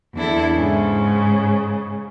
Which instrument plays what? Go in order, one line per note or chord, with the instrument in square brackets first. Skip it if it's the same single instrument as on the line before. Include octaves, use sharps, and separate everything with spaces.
[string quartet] E2 D4 E4 A4
G#2 C#3